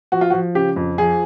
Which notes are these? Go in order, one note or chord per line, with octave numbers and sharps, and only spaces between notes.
F3 F#4
F4
F#4
F3
C#3 G4
F2
F3 G#4